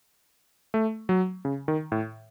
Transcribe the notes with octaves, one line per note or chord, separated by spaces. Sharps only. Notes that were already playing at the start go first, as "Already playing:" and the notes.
A3
F#3
C#3
D#3
A2